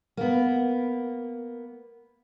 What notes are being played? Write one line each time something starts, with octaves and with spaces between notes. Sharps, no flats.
A#3 B3